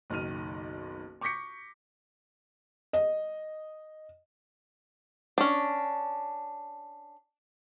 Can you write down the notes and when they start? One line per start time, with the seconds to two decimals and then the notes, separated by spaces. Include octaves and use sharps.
0.10 F#1 B1 D#3 F6 D#7
1.21 C#6 D6 G6 A#6 B6 C#7
2.93 D#5
5.38 C#4 D4